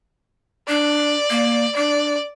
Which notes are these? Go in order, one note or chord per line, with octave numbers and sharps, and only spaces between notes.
D4 D5
A#3
D4 D5